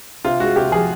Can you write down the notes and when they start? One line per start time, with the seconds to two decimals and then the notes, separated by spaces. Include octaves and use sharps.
0.25 C3 F4
0.40 G#3 F#4
0.56 C3 G4
0.72 F3 G#4